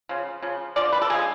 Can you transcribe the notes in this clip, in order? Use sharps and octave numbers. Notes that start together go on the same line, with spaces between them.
C#3 F3
C#3 F3
D3 F3 G#3 D5
B4
A4
D3 F3 G#3 G#4